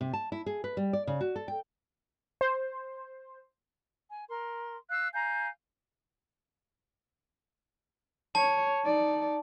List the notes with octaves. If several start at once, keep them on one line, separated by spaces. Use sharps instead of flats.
C3
A5
E4
G#4
B4
G3
D5
C#3
F#4
A4
G5
C5
G#5
A#4 C6
F5 E6 F#6
F5 G#5 A#5 G6
C#5 A5
D#4 D5